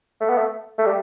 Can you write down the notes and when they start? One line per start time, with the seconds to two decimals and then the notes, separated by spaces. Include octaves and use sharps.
0.21 A3
0.30 B3
0.38 A3
0.79 A3
0.86 G3